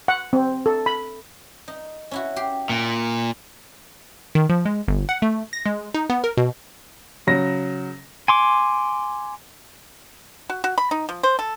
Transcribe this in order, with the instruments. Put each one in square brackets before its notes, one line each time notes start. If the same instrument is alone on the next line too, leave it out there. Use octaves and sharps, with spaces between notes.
[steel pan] F#5
C4
A4
B5
[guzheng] D#4
C#4 E4 F#4
G4 C6
[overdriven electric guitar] A#2
[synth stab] D#3
F3
G#3
G1
F#5
A3
A#6
G#3
D#4
B3
A#4
B2
[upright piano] C#3 F#3 A#6
[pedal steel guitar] G#5 C6 D6
[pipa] F#4
F#4
B5
D#4
F3
C5
A4